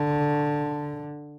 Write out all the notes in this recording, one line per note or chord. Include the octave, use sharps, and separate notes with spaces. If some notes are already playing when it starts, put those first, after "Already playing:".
Already playing: D3